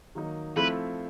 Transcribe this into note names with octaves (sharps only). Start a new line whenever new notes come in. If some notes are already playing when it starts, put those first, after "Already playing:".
D#3 F#3 A#3 D#4
F3 A3 C4 E4 B4